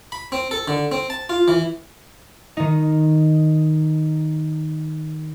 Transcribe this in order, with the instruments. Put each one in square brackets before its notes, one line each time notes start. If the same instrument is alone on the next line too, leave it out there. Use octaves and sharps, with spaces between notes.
[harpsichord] B5
C4
A4
D3
C4
A5
F4
E3
[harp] D#3 D#4